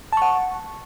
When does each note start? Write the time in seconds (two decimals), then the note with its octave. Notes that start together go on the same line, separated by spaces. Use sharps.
0.12 A5
0.17 C#6
0.22 F#5